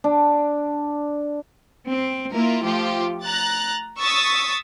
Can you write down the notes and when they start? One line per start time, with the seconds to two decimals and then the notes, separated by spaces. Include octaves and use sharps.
0.04 D4
1.88 C4
2.33 A#3 E4 F4 A#4
2.63 F3 A3 F4 G4
3.23 A#5 F#6 A6
3.99 C#6 D#6 E6 A6 B6